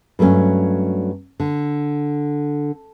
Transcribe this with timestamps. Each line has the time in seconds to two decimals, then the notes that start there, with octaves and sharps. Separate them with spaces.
0.19 G2 F#3 A3 B3 C#4
1.40 D3